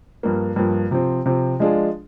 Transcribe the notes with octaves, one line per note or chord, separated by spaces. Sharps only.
G2 F3 A#3
G2 F3 A#3
C3 F3 C4
C3 F3 C4
F3 G#3 D4 F4 G#4